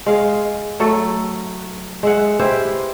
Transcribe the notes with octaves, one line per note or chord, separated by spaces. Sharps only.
G#3 F5
F#3 A3 A4
G#3 E5 F#5
E4 G4 B4 C5